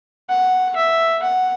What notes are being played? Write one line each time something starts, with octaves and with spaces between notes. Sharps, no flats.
F#5
E5
F#5